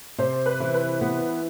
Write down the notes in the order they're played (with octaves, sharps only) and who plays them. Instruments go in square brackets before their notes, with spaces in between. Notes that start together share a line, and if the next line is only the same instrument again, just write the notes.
[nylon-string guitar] C3 [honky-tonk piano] C5
[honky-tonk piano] B4
[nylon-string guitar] E3
[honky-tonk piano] B4
[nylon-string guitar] B3